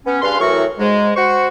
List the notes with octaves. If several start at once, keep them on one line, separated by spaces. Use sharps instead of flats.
B3 C#4
G2 G#4 B4 F5 C6
A2 E3 F#3 F#4 A#4 C#6
G#2 G#3
F#4 C5 C#6